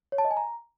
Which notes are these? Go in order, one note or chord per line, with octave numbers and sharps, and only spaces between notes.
C#5
A5
D#5
G#5
A#5